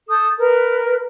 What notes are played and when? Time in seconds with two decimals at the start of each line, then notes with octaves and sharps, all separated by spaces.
0.09 A4 D#6 G6
0.38 A#4 B4